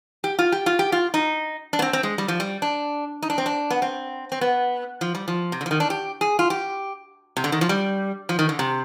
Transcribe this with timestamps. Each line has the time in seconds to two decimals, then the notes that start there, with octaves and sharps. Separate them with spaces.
0.24 G4
0.39 F4
0.52 G4
0.66 F4
0.79 G4
0.92 F4
1.14 D#4
1.73 D4
1.79 B3
1.82 C4
1.93 C4
2.03 G#3
2.18 G3
2.28 F3
2.40 G3
2.62 D4
3.22 D#4
3.30 D4
3.38 C4
3.46 D4
3.70 B3
3.82 C4
4.32 C4
4.41 B3
5.01 F3
5.15 G3
5.28 F3
5.52 C3
5.61 D3
5.66 F3
5.71 D#3
5.80 D4
5.90 G4
6.21 G#4
6.39 F4
6.50 G4
7.37 C3
7.44 D3
7.52 D#3
7.61 F3
7.69 G3
8.29 F3
8.39 D#3
8.49 D3
8.59 C3